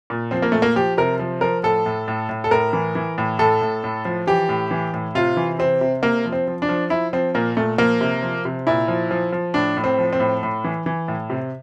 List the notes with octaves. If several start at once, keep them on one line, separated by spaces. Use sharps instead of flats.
A#2
F3 C4
A#3
A#2 A3
A#3
F3 G4
C3 A#4
F3
F3 A#4
A2 A4
A2
A2
A2
A4
A2 A#4
E3
E3
A2
A2 A4
A2
A2
F3
E3 G4
A2
E3
A2
C3 F4
E3
C3 C4
C3
C3 A#3
F3
C4
F3
D4
F3
F3 E4
F3 C4
A#2 A#3
A#2 A3
F3 A#3
C3
F3
C3
A#2 E4
F3
F3
F3
A2 D4
A2
C4
F3
C4
A2
A2
E3
E3
A2
C3